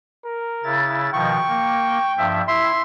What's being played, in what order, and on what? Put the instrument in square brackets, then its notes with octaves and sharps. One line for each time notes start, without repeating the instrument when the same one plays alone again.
[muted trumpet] A#4
[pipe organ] C#3 E4 A6
[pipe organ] B2 D#3 F3 [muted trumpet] G5 [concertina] C#6
[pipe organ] A#3
G2 F3 E5
[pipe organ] E4 [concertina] E5 C6